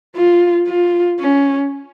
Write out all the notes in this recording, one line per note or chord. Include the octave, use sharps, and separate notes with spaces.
F4
F4
C#4